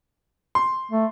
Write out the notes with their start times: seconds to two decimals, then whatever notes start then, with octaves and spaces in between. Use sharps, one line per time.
0.55 C6
0.91 A3